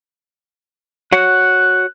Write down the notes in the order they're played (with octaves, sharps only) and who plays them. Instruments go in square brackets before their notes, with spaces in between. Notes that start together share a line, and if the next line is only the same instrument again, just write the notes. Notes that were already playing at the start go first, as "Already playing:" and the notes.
[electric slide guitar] F#4 C#5 F#5 [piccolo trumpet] F#6